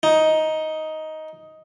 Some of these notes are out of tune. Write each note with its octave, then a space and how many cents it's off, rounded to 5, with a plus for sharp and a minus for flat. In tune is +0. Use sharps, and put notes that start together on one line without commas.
D#4 +10